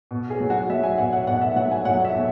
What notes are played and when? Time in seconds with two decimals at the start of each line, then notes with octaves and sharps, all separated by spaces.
0.11 B2
0.30 G#4
0.40 F#3
0.50 F#4
0.69 F#3 E5
0.84 G#5
0.98 B2 F#5
1.13 F#5
1.27 B2 F#5
1.41 E5
1.56 F#3 F#5
1.71 G#5
1.85 F#3 F#5
2.05 E5
2.15 B2